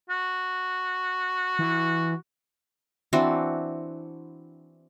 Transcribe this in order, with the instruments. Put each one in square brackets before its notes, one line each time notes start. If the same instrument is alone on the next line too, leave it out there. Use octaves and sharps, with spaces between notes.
[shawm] F#4
[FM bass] E3
[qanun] E3 C4 D4 F#4